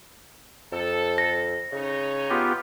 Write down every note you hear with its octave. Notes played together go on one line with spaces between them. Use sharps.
F2 A4
A#6
C#3 D#4 C#5
B3 F4 G4